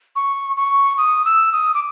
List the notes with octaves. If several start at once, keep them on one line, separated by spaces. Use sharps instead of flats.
C#6
C#6
D#6
E6
D#6
D6